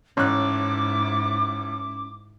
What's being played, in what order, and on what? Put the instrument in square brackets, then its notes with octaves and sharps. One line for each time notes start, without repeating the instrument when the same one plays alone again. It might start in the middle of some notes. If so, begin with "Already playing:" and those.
[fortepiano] A1 F#6 [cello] G#2 E4 [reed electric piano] C#4 [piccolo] D6